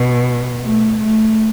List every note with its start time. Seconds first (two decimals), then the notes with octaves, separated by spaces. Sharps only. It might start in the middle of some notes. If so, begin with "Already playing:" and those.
Already playing: B2
0.63 A3
0.99 A3